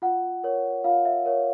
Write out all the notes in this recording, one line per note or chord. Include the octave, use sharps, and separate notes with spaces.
F4 F#5
A#4 C#5
F4 F5
E5
A#4 C#5